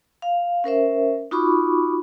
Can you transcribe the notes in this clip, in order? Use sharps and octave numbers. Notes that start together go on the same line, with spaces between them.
F5
C#4 A#4 C5 E5
D#4 F4 F#4 B5 C#6 D6